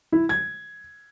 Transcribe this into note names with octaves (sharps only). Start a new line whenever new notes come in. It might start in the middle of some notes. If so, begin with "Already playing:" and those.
E4
G#6